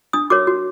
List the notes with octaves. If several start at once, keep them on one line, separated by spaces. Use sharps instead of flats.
D4 D#6
F#4 A#4 C#5 D6
F#4